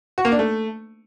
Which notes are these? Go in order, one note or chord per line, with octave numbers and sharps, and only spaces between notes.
F#4
A#3
D4
A3